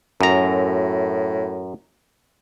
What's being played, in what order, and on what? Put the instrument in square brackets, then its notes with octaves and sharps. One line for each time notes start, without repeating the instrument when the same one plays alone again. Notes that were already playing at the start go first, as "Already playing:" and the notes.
[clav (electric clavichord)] F#2 A#5 [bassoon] A2